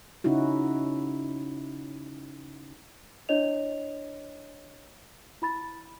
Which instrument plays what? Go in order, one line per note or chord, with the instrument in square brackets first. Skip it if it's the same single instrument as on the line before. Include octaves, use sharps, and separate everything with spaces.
[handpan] C#3 C#4 D#4 E4 F#4
[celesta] D4 E4 C#5 D#5 F7
E4 B5 A6